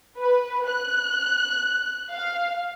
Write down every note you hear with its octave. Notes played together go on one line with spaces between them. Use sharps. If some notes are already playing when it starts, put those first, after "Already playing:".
B4
F#6
F5